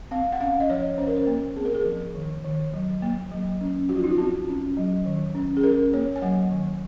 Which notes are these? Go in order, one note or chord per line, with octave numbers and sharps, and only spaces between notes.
C4 F5
F#5
C#4 F5
D#5
F3 C#5
C#4 C5
A#4
C5
A#3
C4 G#4
A#4
G#4
F3
D#3
D#3
F#3
A#3
F#3
C#4
F3 F#4
F4
D#4
F4
C4 F#4
C#4
F#3
D#3
C#4
G#4
C#4 A#4
A#3 C#5
G#5
F#3 F#5
D#3